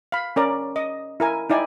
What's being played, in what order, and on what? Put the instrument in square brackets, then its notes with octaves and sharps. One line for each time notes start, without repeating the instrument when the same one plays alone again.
[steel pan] F5 B5
C#4 A#4 D5
D#5
E4 A#4 G#5
D#4 E4 D5 G5 G#5